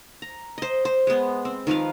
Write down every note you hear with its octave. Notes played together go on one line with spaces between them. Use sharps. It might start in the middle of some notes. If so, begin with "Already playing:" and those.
A#5
C5 D#5
C5
G#3 B3
C4
D#3 F3 B4 F5